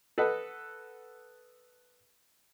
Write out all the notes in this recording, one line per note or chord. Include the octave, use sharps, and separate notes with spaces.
A4 B4 D#5 F#5